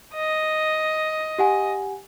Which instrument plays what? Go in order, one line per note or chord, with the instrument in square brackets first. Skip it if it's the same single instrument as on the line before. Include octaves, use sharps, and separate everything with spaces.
[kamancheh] D#5
[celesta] G4 F#5 G#5